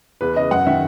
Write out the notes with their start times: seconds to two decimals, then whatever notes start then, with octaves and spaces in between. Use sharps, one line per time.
0.21 E2 B4
0.36 C#3 D#5
0.51 F#2 F#5
0.67 D#3 E5